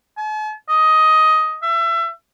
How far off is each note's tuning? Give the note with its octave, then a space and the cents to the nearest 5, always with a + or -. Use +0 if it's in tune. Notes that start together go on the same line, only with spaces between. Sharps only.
A5 -45
D#5 +10
E5 +30